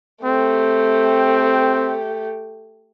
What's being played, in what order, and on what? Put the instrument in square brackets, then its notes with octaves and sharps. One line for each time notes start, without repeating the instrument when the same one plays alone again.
[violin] A3 G4 [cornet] C4